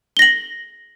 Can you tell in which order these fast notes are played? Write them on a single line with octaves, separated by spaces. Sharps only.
G7 A#6 F#7